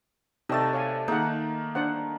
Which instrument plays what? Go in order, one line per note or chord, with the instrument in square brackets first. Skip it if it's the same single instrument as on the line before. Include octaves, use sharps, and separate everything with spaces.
[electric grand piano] C3 D5 A6 [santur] A3 A5 [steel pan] D#4 D#5 G5
[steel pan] C#5 F5 G#5
[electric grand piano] D#3 A#3 [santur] D#4 [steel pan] G#4 F#5
[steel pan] D4 C5 F#5